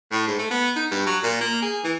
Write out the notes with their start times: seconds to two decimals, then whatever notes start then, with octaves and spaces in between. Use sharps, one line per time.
0.12 A2
0.27 G#2
0.39 A3
0.51 B3
0.76 D#4
0.91 G2
1.07 F#3
1.23 A#2
1.41 A#3
1.62 G#4
1.84 E3